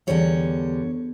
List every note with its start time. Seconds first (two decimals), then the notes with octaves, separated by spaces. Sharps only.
0.07 E2 D3 G3 C#5